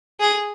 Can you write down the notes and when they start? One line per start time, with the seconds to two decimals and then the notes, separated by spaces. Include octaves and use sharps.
0.20 G#4